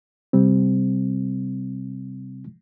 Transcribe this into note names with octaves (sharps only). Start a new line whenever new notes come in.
C3 G3 C4